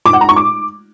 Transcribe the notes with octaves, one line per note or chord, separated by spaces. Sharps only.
D6
F#5
A#5
C#6
D6